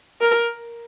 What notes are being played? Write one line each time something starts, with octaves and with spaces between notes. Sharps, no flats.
A#4